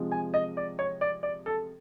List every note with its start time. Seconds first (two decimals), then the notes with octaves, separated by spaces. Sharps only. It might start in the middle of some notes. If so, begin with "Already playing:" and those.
Already playing: C3 F3 G#3
0.12 G#5
0.34 D#5
0.57 D5
0.79 C#5
1.01 D5
1.23 D5
1.46 A4